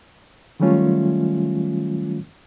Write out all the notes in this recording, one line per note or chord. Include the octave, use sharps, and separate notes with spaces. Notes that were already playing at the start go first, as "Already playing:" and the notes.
D#3 F#3 G3 A3 C#4 F4